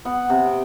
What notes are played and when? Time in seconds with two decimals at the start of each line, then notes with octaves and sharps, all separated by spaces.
0.05 B3 F#5
0.30 C3
0.46 G5